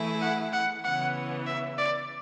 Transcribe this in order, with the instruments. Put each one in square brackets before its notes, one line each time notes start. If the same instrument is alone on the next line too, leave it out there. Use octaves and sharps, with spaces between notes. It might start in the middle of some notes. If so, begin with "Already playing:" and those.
Already playing: [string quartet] E3 A3 E4 G#4
[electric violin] F#5
F#5
[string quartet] C#3 E3 B3 [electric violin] F#5
[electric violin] E5
D5